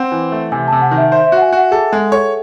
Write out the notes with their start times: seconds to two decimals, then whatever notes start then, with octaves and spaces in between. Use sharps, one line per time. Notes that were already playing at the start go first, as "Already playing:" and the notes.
Already playing: C4 F#5
0.12 E3
0.32 A3
0.52 C3 G#5
0.68 C3 A5
0.82 F#5
0.91 D#3
0.97 E5
1.12 C5 E5
1.27 E5
1.32 F#4 F#5
1.42 G#5
1.53 F#4 F#5
1.71 G#4 A4
1.92 G#3 A4
2.12 A4 C#5